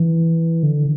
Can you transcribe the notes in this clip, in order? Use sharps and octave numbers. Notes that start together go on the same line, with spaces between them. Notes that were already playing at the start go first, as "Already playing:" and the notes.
Already playing: E3
D3